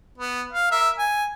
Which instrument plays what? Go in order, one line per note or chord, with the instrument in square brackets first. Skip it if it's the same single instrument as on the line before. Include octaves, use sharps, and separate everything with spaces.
[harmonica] B3
F5
A#4 E5
G#5